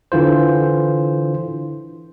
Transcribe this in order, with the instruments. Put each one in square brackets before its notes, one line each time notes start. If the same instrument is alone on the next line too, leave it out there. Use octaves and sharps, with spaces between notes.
[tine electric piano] D3 E3 F4 C5